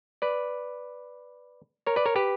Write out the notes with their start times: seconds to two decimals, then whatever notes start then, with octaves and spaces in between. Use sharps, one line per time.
0.22 B4 D5
1.87 A#4 C#5
1.96 B4 D5
2.05 A#4 C#5
2.16 G4 B4